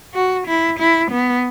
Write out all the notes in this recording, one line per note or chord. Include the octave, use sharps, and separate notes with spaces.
F#4
E4
E4
B3